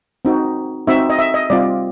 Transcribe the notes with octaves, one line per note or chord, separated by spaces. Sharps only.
C4 D#4 F#4
C4 D#4 F#4 E5
D#5
E5
D#5
G3 C4 F4 D5